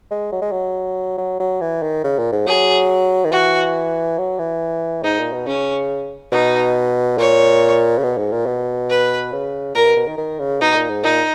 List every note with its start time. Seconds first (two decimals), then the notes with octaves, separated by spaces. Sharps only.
0.11 G#3
0.32 F#3
0.42 G#3
0.52 F#3
1.18 F#3
1.40 F#3
1.61 E3
1.83 D#3
2.04 C#3
2.19 A#2
2.32 G#2
2.47 F#3 G#4
3.25 D#3
3.32 E3 F#4
4.18 F#3
4.39 E3
5.03 G#2 D#4
5.18 A#2
5.33 B2
5.47 C#3 C#4
6.32 B2 D#4
7.18 A#2 C#5
7.98 C#3
8.03 B2
8.18 G#2
8.32 A#2
8.46 B2
8.90 B4
9.32 C#3
9.75 A#2 A#4
9.86 B2
9.96 B2
10.07 D#3
10.18 D#3
10.39 C#3
10.61 B2 D#4
10.75 A#2
10.89 G#2
11.03 A#2 D#4